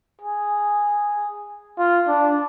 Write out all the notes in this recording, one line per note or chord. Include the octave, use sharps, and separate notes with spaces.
G#4
F4
D4